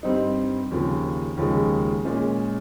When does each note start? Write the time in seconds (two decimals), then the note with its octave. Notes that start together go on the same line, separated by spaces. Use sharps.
0.03 G2 G3 C4 D#4
0.71 D#2 C#3 F3
1.37 D#2 C#3 F3 G#3
2.05 A#2 G#3 C#4